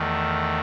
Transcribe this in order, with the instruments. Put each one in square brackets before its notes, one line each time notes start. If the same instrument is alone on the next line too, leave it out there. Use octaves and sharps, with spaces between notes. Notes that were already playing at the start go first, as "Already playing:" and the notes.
Already playing: [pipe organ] E2 D#3 A3